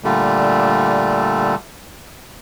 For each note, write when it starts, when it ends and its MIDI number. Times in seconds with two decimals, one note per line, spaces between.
0.04 1.55 46
0.04 1.55 50
0.04 1.55 55
0.04 1.55 57